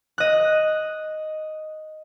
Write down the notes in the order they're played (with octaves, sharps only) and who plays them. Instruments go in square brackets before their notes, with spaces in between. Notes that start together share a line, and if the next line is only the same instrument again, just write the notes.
[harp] D#5 F#6